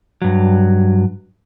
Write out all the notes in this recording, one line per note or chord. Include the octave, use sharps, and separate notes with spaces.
G2 F#3